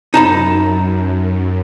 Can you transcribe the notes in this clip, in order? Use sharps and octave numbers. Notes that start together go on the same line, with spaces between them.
F#2 D#4 A5 B5